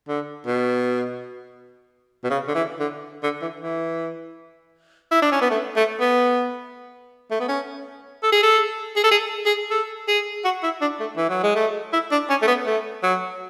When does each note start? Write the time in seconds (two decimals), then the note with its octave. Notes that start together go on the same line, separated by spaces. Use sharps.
0.08 D3
0.46 B2
2.24 B2
2.30 C#3
2.47 D3
2.55 E3
2.80 D3
3.23 D3
3.42 E3
3.60 E3
5.11 E4
5.22 D4
5.32 C#4
5.41 B3
5.51 A3
5.76 A3
6.00 B3
7.31 A3
7.40 B3
7.48 C#4
8.23 A4
8.32 G#4
8.43 A4
8.96 G#4
9.04 A4
9.11 G#4
9.45 G#4
9.70 A4
10.08 G#4
10.44 F#4
10.63 E4
10.81 D4
11.00 A3
11.17 E3
11.29 F#3
11.43 G#3
11.55 A3
11.93 E4
12.11 D4
12.30 C#4
12.42 A3
12.47 B3
12.66 A3
13.03 F#3